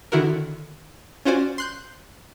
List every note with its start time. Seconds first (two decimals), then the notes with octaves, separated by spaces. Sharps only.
0.12 D3 D#3 E4 F#4 A#4
1.25 C#4 F4 F#4 C5 D5 G#5
1.58 C6 F#6 G6